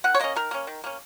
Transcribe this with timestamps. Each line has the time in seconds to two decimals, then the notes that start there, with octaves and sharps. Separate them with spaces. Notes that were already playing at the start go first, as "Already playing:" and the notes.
0.04 D#3 F#5
0.15 C#5
0.20 A#3 C#4 D#5
0.36 D#3 A#4
0.51 A#3 C#4
0.67 D#3
0.84 A#3 C#4